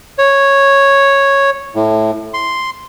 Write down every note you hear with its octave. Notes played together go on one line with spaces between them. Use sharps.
C#5
A2
C6